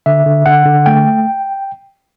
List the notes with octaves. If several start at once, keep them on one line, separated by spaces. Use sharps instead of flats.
D3 E5
D3
D3 F#5
D3
A3 G5